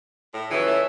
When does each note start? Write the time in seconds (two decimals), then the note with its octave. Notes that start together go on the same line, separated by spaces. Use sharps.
0.32 A2
0.50 C#2 E3 F#3 G#3 B3 C#5
0.65 A3